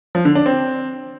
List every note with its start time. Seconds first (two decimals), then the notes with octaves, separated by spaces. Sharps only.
0.15 F3
0.25 D3
0.35 D4
0.46 C4